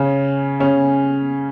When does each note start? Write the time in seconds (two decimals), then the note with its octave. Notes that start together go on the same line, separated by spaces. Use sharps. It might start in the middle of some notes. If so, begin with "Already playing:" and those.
Already playing: C#3 C#4
0.60 C#3 C#4